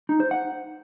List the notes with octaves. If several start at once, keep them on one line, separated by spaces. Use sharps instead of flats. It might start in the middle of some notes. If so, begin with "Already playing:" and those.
D#4
C5
F#5